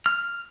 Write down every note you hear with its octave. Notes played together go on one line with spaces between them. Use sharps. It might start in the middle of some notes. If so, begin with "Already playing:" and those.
F6